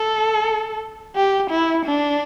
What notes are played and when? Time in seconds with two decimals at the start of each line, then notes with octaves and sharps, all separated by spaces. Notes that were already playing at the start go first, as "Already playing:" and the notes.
Already playing: A4
1.16 G4
1.51 E4
1.86 D4